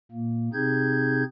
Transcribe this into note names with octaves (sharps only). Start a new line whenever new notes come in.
A#2 A#3
C3 C4 D#4 G#4 G6 G#6